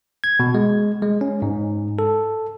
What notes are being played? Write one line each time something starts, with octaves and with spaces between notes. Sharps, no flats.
G#6
B2
G#3
G#3
C#4
G#2
A4